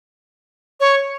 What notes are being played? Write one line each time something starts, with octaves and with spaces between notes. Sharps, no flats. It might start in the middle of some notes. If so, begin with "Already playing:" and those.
C#5